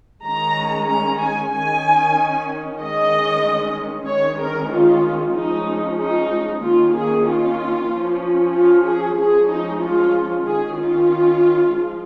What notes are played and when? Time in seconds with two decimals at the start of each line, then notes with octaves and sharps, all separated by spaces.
0.23 D#3 G#3 C#4 A#5
0.87 A#5
1.19 G#5
1.51 D#3 C#4 G#5
2.79 D#3 G#3 C#4 D#5
4.06 D#3 G#3 C#4 C#5
4.39 A#4
4.71 F4
5.34 F3 G#3 C#4 D#4
5.99 D#4
6.62 D#3 A#3 C#4 F4
6.94 G#4
7.27 F4
7.90 F3 C#4
8.54 F4
8.86 G#4
9.18 F3 G#3 C#4 G#4
9.49 D#4
9.82 F4
10.46 D#3 C#4 G#4
10.78 F4
11.73 F3 G#3